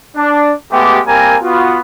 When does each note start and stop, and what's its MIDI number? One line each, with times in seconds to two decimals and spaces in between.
0.16 0.52 62
0.72 1.00 56
0.72 1.00 57
0.72 1.00 59
0.72 1.00 67
1.07 1.37 55
1.07 1.37 58
1.07 1.37 60
1.07 1.37 70
1.07 1.37 80
1.07 1.37 82
1.43 1.80 59
1.43 1.80 65
1.43 1.80 66